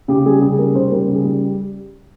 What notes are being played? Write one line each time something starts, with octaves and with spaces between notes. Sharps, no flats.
C#3 G4
G3 G#4
C#3 G#4
G3 A#4
C#3 C5
G3 A#4
C#3
G#4
G3 G4